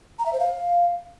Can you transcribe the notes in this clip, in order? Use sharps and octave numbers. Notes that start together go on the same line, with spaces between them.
A#5
E5
C5
F5